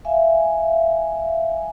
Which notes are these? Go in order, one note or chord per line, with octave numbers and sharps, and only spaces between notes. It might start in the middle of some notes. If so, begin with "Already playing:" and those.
E5 F5 G#5